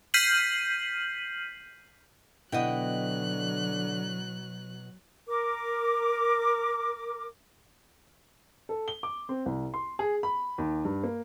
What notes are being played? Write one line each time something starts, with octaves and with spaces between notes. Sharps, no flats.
F6 G6 B6 C7 D#7 F#7
B2 D3 F#3 E4 D#5 F#5 G5 F#6
A#4 D6
A4
G7
D6
C4
C2
C6
G#4
B5
D#2
G2
A#3